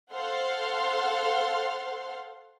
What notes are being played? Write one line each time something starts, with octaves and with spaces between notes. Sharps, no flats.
A4 C5 F5 F#5 C6 F6